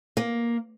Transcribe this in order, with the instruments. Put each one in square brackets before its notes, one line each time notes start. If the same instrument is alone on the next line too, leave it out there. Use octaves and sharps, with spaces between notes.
[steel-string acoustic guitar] A#3